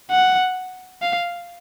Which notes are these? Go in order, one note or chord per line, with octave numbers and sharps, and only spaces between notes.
F#5
F5